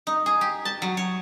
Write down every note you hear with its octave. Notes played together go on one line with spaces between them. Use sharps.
D#4
G#4
G4
A5
F#3
C#5